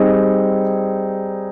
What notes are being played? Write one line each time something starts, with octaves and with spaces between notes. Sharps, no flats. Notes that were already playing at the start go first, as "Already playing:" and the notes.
Already playing: G3 C4 D#4 G#4